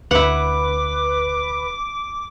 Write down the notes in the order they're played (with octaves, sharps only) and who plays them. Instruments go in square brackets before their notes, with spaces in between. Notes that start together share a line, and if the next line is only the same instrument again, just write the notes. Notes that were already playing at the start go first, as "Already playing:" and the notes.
[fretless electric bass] D2 [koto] E4 F#5 [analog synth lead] B4 [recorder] D6